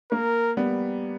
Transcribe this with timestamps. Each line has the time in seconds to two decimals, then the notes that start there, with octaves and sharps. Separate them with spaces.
0.12 A#3 A#4
0.57 G3 B3